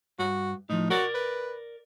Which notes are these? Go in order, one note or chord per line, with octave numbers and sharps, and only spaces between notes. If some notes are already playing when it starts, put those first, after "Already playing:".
G2 F#4
A2 F3 D#4
F#4 A#4 D5
B4